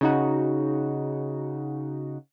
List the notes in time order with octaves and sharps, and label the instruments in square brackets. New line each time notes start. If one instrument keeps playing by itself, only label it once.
[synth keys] C#3 D#4 F#4